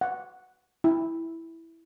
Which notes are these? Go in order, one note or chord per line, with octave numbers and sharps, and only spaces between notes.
F#5
E4